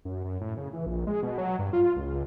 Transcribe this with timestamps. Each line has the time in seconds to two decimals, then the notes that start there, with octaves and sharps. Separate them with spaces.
0.05 F#2
0.24 F#2
0.41 A2
0.57 C#3
0.73 E3
0.86 A#1
1.07 G#3
1.23 B2
1.38 F#3
1.59 G2
1.73 F4
1.97 C#2